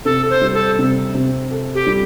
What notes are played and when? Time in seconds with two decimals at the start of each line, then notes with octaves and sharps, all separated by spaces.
0.05 C3 A4
0.30 C5
0.41 G3
0.54 A4
0.79 C3
1.15 C3
1.51 A4
1.75 G4
1.87 G3